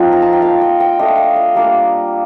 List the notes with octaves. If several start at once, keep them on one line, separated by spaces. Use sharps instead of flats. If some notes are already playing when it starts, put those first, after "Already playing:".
Already playing: F3 C4 D#4 F4 G5
A#5
A5
G5
A#3 D#4 F5
D#5
G5
A3 D4 F4 D#5
F5
D#5
G3 A#3 D4